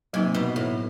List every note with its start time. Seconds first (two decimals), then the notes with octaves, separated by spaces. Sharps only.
0.13 C3 F#3 A#3 D#4
0.34 B2
0.56 A2